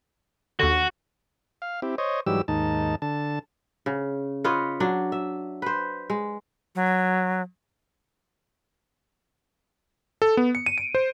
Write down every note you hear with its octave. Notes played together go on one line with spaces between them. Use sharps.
D#2 D3 F#4
F5
C4 E4 G4
C5 C#5 D#5
G#2 E3 F#3 G3 G4 E6
D#2 G#2 D#4 A5
D3 A5
C#3
F4 B4 C#5 D#5
F#3 D4
E5
B4 C5
G#3
F#3
A4
B3
C#7
D#7
D7
C5